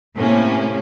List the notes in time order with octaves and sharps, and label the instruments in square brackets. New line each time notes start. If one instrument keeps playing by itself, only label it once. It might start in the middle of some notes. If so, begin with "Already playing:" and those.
[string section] A2 C3 A#3 C#4